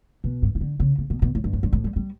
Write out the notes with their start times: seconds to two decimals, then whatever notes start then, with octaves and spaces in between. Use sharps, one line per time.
0.24 B2
0.42 G2
0.55 E3
0.61 D3
0.80 C#3
0.98 C#3
1.10 B2
1.22 B2
1.35 A2
1.44 G2
1.53 F#2
1.63 G2
1.73 A2
1.84 G3
1.96 G3